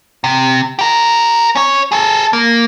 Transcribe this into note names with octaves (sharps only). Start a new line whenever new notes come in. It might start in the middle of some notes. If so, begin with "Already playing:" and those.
C3
G4 A#4
C#4 C#5
G#4 A4
A#3